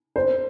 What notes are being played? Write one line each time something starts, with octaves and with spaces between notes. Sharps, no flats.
C5